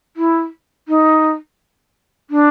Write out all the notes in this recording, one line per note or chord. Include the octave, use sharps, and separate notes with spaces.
E4
D#4
D4